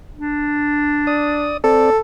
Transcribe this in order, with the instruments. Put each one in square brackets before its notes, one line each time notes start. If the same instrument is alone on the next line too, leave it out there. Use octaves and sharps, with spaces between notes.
[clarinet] D4
[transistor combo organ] D5 D#6
[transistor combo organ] C4 D5 [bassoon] A4